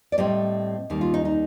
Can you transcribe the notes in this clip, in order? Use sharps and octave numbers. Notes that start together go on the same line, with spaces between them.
D5
A2 G3 C4 D#5
D#2 D#3 G3
F4
D#4
D#4